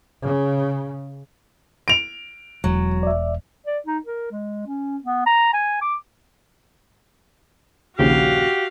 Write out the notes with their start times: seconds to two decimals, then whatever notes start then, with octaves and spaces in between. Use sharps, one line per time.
0.24 C#3
1.88 D7 F7
2.64 E1 F#3
3.03 D5 E5
3.66 D5
3.86 D#4
4.05 A#4
4.31 G#3
4.66 C#4
5.04 B3
5.26 A#5
5.53 G#5
5.82 D6
7.99 A#1 D#2 C#3 F#4 G4 F5